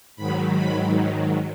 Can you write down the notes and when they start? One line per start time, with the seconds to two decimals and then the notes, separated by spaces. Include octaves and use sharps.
0.16 G#2 D#3 F#3 B5
0.55 B5